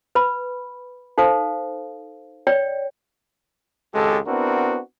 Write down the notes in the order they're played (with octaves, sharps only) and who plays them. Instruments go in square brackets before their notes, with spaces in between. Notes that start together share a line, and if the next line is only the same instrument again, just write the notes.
[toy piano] B4 B5
D#4 A4 C5 F5
C#5 D5 G5
[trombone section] G#1 C#2 G#3 G4 A4
B3 C4 D4 E4 F#4 A#4